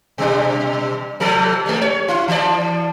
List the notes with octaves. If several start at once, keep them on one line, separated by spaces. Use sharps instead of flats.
B2 G3 D4
C3 F3 A4
G3 G#3
C#5
E4
E3 D5